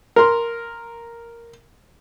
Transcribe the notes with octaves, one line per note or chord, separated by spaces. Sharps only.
A#4 C6